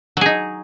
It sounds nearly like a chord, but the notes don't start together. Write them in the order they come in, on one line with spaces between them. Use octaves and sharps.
F#3 G#4 D#4